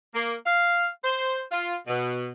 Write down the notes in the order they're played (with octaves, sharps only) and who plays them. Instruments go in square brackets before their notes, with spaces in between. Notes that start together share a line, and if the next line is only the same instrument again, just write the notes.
[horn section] A#3
F5
C5
F4
B2